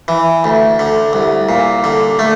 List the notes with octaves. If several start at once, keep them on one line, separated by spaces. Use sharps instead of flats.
E3
D2
D3
C2
A#2
D3
A3